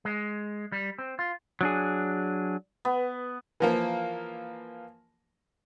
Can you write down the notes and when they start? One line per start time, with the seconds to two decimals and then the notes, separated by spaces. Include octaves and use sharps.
0.05 G#3
0.72 G3
0.99 C4
1.19 F4
1.61 F#3 D4 G#4
2.85 B3
3.60 E3 F3 A#3